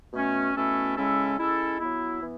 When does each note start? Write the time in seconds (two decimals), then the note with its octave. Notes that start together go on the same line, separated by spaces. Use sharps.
0.13 B2 A3 C#4
0.55 B2 A3 C#4 E4 A4
0.96 C#3 G#3 C#4 E4 A4
1.39 G#3 C#4 E4 A4
1.80 F#3 B3 E4
2.21 E3 B3